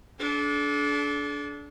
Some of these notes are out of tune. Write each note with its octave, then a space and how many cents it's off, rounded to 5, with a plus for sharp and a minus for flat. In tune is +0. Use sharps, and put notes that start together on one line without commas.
D4 -20 A4 -45